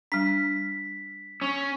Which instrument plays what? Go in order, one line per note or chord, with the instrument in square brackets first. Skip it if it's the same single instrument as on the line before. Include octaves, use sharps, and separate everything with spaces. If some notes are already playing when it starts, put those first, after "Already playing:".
[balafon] G3 D4 [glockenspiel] B6
[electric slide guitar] C#4